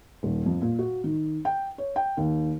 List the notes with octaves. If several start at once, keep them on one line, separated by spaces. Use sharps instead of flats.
D#1
F2
A#2
F#4
D#3
G5
C#5
G5
D#2